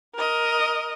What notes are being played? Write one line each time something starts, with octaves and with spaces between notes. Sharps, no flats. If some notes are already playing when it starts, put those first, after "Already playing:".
A#4 D#5